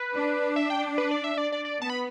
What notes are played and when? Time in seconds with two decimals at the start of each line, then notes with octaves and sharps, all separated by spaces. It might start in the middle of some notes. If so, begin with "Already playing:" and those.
Already playing: B4
0.15 D4
0.56 E5
0.70 G5
0.98 B4
1.11 D5
1.24 E5
1.38 D5
1.52 D5
1.65 D5
1.79 B3 A5
1.90 B5